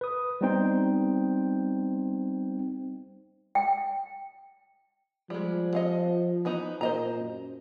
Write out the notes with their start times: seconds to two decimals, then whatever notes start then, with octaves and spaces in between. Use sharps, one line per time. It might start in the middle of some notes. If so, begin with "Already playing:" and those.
0.01 B4 D#6
0.41 G3 B3 C4 D#4 C5 G5
3.55 G5
5.30 F3 G3 G#3
5.73 D#5 F5 F#5
6.45 E3 B3 D#4
6.81 A#2 C5 D#5 A#5
7.19 F#2